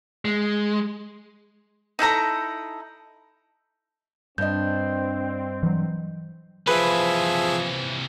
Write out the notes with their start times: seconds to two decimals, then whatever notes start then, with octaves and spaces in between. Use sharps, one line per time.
0.25 G#3
1.99 D#4 E4 A4 A#5
4.38 G2 C4 D4 D#5 G6
5.63 E3 F#3
6.67 C3 E3 F3 G#4 B4 E5